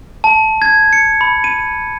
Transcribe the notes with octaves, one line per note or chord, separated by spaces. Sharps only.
A5
G#6
C#7
B5
D#7